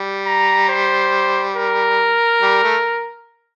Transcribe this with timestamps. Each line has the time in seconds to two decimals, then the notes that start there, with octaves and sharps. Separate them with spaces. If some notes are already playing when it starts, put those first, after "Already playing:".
Already playing: G3
0.26 A#5
0.69 C5
1.56 A#4
2.42 G3
2.63 A3